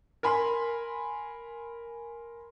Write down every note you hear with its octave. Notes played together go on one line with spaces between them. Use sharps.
A#4 G#5 B5 C6